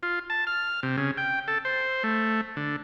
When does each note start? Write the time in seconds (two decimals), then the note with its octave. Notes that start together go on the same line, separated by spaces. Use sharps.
0.03 F4
0.30 A5
0.47 F6
0.83 C3
0.98 C#3
1.17 G5
1.48 A4
1.65 C5
2.03 A3
2.57 D3